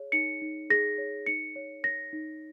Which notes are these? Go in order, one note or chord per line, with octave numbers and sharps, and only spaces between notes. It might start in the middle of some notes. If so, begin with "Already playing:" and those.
Already playing: G#4 C#5
D#4 C#7
D#4
G#4 A#6
C#5
D#4 C#7
C#5
C#5 A#6
D#4